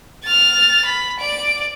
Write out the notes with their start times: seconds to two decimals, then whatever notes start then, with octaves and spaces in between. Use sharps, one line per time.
0.24 F6 A6
0.85 B5
1.20 D5 D7